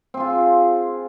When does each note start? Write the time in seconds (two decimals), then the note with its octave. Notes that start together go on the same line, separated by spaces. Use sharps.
0.14 C4
0.17 G#4
0.20 F4